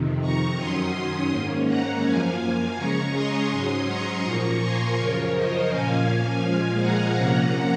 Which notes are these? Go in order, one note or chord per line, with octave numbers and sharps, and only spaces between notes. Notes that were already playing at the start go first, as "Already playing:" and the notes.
Already playing: F2 C3 D#3
A#5 C#6
F#2 D#3 F#3 C#4 C6 D#6
G#2 D#3 A#3 C#4
F#5 A#5
F#2 F3 A#3 F5 G#5
C#3 G#3 C#4 A#5 C#6
C6 D#6
G#2 F#3 C#4
A#5 C#6
A#2 F3 A#3 A#5 C#6
G#5 C6
F#2 C#3 F3 A#4 C#5
C5 D#5
A#2 F3 A#3 C#4 F5 G#5
A#2 F3 G#3
F#5 A#5
C3 F3 A#3 C#4 F#5 A#5